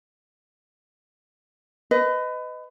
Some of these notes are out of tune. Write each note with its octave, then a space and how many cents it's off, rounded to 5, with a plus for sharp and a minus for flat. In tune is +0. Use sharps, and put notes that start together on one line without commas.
B4 +30 D#5 +0